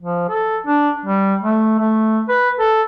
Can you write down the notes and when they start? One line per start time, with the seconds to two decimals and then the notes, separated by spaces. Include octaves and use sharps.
0.02 F3
0.29 A4
0.67 D4
1.06 G3
1.42 A3
1.79 A3
2.29 B4
2.59 A4